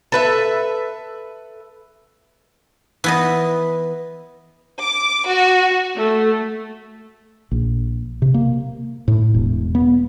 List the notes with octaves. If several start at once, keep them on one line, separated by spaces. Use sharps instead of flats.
A4 B4 E5
E3 B3 D#5
D6
F#4
A3
A#1
C3
A#3
A2
E1
B3